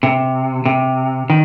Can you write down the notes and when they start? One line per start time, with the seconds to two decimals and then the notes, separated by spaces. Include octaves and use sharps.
0.03 C3
0.65 C3
1.30 D#3